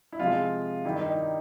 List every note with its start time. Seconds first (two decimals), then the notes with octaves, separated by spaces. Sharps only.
0.12 E4
0.20 C3 F3 G#3 F4
0.85 G2 D#3 G3 E4
1.01 D#4